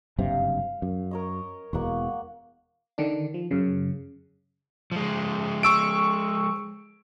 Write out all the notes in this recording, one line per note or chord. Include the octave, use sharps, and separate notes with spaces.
F#1 G2 C3 F5
F#2
A#4 C#5 D#5
E1 E2 B2 A#3 F#5 C#6
D3 D#3 D4
F3
F#2 C#3
F3 G#3
C#6 E6 D7